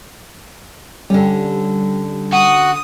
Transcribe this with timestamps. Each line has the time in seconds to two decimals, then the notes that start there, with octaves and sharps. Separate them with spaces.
1.10 D3 G3 C#4
2.33 F#4 D#6